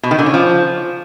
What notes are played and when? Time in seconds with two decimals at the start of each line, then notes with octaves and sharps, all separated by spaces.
0.03 B2
0.11 D#3
0.19 D3
0.26 C#4
0.34 F3